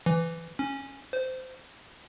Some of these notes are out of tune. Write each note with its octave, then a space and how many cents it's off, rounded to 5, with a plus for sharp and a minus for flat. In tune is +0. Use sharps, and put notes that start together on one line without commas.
E3 +15
C#4 -10
C5 -20